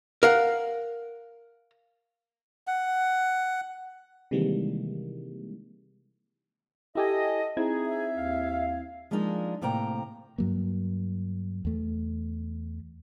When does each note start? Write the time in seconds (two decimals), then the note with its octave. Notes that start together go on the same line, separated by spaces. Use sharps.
0.23 A#4 F5 F#5
2.67 F#5
4.31 C3 D#3 E3 G3 G#3 A#3
6.95 E4 G4 A4 D#5 G#5
7.57 C4 D#4 E4 G#4 G#6
7.86 E5
8.16 D#2 F5
9.11 F3 G#3 A#3 D4 D#4 F4
9.61 A2 C3 A#3 G5 A#5
10.38 G2 F#3 A#3
11.65 E2 A3